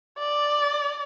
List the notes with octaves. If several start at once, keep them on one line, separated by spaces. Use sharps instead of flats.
D5